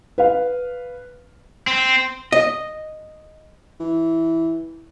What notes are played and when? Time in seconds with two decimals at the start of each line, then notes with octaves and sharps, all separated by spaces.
0.18 B4 F5
1.67 C4
2.32 D#5
3.80 E3